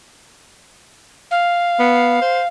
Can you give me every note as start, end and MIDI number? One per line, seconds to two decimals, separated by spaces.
1.31 2.47 77
1.80 2.20 59
2.22 2.41 72